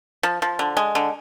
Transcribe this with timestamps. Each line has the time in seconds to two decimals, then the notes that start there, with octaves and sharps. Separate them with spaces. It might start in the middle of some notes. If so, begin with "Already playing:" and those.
0.23 F3
0.42 F3
0.59 D3
0.77 G#3
0.95 D3